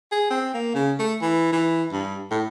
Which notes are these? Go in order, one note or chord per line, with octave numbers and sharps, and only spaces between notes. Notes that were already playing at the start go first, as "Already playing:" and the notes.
G#4
C4
A#3
C#3
A3
E3
E3
G2
A2